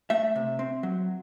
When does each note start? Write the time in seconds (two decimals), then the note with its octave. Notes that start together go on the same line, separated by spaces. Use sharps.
0.10 A3 E5
0.36 C3
0.59 C4
0.83 F#3